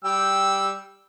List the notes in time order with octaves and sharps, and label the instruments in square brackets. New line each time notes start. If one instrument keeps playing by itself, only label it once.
[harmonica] G3 G5 E6